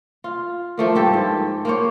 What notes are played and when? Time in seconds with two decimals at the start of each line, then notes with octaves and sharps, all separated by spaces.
0.24 F4
0.78 F3 A3 A#3
0.95 G2 G4 A4
1.13 G#2
1.65 A#3 C5 C#5